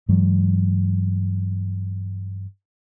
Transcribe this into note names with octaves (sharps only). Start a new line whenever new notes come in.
G2 E3 F#3 G#3